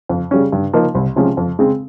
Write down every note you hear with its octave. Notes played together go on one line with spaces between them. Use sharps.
F2
C#3 G3 C#4
G2
F3 A#3 D#4
C2
C3 F3 G#3 C#4
F2
C#3 G#3 C4